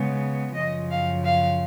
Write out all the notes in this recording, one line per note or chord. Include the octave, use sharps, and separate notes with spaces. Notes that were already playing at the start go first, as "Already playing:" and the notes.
Already playing: C#3 G#3 B3
F#2 C#3 F3 D#5
F5
F5